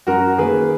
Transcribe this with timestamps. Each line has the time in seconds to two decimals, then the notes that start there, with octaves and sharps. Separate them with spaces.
0.07 F#2 F#4 A#4
0.38 D#3 A#3 G#4 B4